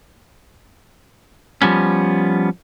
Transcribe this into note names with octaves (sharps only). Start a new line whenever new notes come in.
F3 G3 B3 C#4